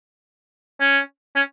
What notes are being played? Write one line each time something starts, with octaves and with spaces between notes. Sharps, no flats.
C#4
C#4